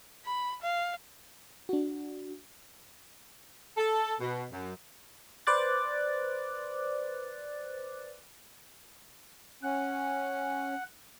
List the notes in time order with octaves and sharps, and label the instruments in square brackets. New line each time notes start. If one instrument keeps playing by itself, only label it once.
[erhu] B5
F5
[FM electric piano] D4 F#4
[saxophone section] A4
B2
F#2
[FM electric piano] B4 C5 D5 D6 F#6 A6
[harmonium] C#4 [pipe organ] F#5